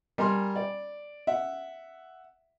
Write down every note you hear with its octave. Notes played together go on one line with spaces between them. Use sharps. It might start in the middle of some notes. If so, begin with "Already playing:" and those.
G3 A#4 G#5 C6
D5
E5 F#5